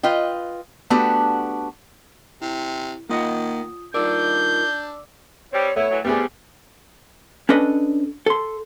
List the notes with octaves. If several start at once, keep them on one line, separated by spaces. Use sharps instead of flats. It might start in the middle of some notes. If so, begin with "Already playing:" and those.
F4 B4 D#5 G5
A3 B3 D4 F#4 G4
C3 E4
D#3 A#3 F4 D#5 F#5 D#6
D4 D#4 F4 A#4 D5 D6 E6 G6
G3 C4 C#5
A3 B3 E4 C#5
E3 F#3
A2 C3 G3 A3 B3 G4 G#4
C#4 D4 A4 B4 D#5
A4 C6